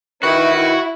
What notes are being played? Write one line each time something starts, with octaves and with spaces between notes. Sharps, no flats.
D#3 E4 F#4 B4